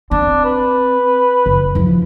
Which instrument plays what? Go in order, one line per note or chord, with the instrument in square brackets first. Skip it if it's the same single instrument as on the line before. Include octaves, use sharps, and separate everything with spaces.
[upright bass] C4 [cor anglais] D4
[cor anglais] B4
[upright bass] F#1
E2 F3